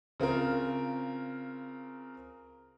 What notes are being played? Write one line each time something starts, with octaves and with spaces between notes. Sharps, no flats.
C#3 C4 F4 A#4